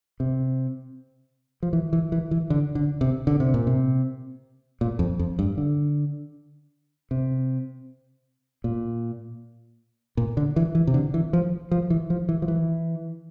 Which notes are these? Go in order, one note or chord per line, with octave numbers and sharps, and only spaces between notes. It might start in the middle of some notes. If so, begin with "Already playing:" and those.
C3
F3
E3
E3
E3
E3
D3
D3
C3
D3
C3
A#2
C3
A#2
F2
F2
G2
D3
C3
A#2
A#2
D3
E3
E3
C3
D3
E3
F3
F3
E3
F3
E3
F3
E3